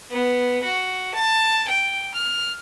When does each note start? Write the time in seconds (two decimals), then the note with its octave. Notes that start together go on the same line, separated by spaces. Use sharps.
0.10 B3
0.63 F#4
1.14 A5
1.68 G5
2.14 F6